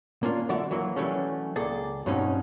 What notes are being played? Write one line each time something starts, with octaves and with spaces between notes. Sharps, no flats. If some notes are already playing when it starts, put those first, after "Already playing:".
A#3 C#4 D4 F4
D3 F#3 D5 E5
E3 F#3 A#3
E3 F#3 G3 A3 C#4
C#2 A#3 G#4 A4 D5
G2 B2 F#3 C4 C#4 D#4